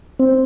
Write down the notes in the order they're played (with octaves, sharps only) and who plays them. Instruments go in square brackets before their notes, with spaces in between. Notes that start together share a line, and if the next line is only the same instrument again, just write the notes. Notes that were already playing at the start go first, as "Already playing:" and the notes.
[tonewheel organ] C4